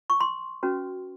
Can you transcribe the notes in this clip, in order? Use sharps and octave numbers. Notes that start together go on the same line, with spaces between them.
C#6
C6
C#4 F#4 B4